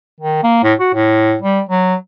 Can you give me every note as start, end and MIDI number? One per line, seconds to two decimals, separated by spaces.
0.20 0.40 51
0.43 0.61 58
0.63 0.73 45
0.80 0.90 66
0.94 1.35 45
1.41 1.61 55
1.69 1.95 54